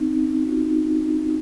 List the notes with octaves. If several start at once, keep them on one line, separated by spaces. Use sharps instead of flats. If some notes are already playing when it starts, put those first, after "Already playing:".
Already playing: C4 C#4 D#4
C#4
F#4
F4
D#4
F4